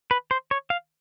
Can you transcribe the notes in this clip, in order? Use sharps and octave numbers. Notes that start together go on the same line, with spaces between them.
B4
C5
C#5
F5